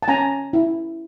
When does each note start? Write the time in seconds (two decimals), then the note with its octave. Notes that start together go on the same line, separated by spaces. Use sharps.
0.03 A5
0.08 C#4 G#5 A#5
0.53 E4